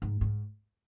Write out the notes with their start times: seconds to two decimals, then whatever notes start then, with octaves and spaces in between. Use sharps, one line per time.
0.02 G#2
0.21 G#2